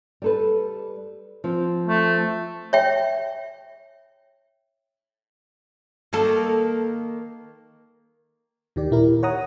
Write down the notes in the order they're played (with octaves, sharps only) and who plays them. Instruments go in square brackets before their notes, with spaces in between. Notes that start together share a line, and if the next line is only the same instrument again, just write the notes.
[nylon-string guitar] G3 A4 B4
F3 C4
[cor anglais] A3
[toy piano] C#5 E5 G5
[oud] D#3 A#3 A4
[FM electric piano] D#2 D#3 G4 D5
A#2 E4 A#4
C#5 F#5 A#5 D#6